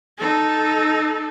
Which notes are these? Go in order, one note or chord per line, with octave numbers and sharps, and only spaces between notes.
D#4 A4